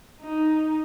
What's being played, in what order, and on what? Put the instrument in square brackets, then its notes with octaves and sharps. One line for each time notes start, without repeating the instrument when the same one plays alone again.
[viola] D#4